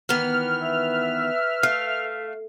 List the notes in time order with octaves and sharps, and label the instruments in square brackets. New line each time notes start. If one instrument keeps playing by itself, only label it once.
[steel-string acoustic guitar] D#3 E3 B3 [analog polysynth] F6
[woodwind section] B4 E5
[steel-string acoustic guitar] A3 [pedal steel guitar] F5